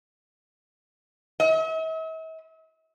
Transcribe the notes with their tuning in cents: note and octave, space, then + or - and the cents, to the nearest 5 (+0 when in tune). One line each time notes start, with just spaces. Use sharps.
E5 -45